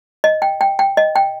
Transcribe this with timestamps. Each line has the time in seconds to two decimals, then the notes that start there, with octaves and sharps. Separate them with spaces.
0.24 D#5
0.42 G5
0.61 G5
0.79 G5
0.97 D#5
1.16 G5